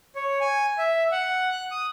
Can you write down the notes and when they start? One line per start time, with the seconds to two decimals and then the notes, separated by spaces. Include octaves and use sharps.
0.16 C#5
0.41 G#5
0.78 E5
1.12 F#5
1.52 F#6
1.71 D#6